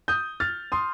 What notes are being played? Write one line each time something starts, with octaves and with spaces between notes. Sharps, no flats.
D#6 G6
F6 A6
C6 D#6